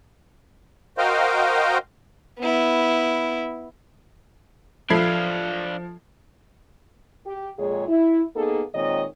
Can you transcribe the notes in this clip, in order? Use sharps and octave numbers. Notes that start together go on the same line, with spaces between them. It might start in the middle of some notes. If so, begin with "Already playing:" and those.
F#4 A#4 C5 D#5 F5 G5
B3 E4
F3 D4 A4 E5 F5 B5 G#6 C7
G4
F2 A#2 G#3 F4 G#4 C#5
E4
A#3 B3 D#4 G#4 A4
A#2 D#3 G#3 C4 C#5 D#5